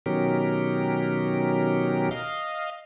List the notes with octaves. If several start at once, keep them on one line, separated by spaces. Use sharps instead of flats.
B2 D#3 F#3 C#4 G4 A#4
D#5 F5